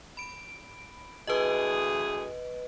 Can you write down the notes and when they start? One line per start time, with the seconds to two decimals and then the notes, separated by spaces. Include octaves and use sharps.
0.17 B5 D7
1.27 D2 E3 G#4 B4 D#5